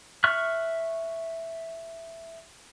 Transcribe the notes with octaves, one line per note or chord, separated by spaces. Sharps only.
E5 C#6 F6 F#6